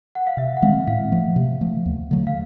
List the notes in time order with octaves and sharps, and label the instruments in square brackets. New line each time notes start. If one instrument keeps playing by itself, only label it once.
[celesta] F#5
F5
[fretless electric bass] C3 [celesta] E5
[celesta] F#5
[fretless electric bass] D#3 G#3 C4 [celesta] F5
[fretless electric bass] A2 [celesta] F5
[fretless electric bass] F3 A3
C3
F3 A3
D#2
D3 F#3 A3
[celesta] F5